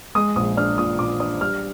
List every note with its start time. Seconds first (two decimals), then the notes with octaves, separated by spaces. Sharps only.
0.15 G#3 D#6
0.36 A#1 D#6
0.57 D4 F6
0.78 A#2 D#6
0.99 A#2 D6
1.20 D4 D#6
1.41 G3 F6